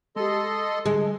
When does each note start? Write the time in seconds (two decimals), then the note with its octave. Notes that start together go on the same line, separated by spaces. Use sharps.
0.16 G#3 G4 A4 D#5 C6
0.86 D3 G3 G#3